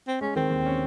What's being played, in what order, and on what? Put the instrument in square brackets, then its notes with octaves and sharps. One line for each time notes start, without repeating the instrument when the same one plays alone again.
[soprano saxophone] C4
[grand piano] G#3 [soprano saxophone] C#4
[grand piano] D#3 [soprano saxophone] C4
[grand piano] D#2
C#4